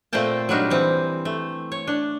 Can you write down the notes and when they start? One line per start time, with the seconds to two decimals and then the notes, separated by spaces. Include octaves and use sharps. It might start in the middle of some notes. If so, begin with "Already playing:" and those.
0.13 A#2 A3 C4 C5 G5 A5
0.49 F#3 G3 D4 D#4 A#4
0.70 E3 C4
1.25 A3
1.72 C#5
1.87 D4